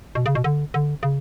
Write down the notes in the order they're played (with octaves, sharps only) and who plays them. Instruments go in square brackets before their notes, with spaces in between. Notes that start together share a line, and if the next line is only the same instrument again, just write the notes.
[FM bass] B2
C#3
B2
D3
D3
C#3